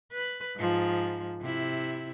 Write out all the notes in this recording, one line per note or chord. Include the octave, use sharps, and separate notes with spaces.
B4
G#2 F3
C3 E4